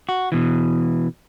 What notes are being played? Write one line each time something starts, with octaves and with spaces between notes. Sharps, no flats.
F#4
B2 E3